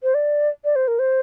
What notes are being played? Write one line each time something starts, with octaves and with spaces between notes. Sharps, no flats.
C5
D5
D5
C5
A#4
C5